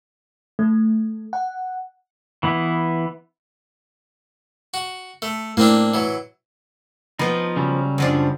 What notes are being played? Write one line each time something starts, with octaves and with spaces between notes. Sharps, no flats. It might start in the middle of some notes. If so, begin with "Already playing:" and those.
A3
F#5
E3 B3 E4
F#4
A3
A2 A#3 C4 D4
E3 F#3
F3 B3 D#4
C#3 F#3 G3
F#2 F3 D4